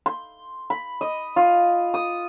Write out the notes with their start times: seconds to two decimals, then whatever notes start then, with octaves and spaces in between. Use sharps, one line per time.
0.06 C6
0.70 B5
1.01 D#5
1.36 F4
1.94 D#6